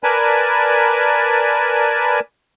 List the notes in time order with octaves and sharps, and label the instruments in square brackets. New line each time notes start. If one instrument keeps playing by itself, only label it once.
[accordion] A#4 B4 D5 G#5 A5 B5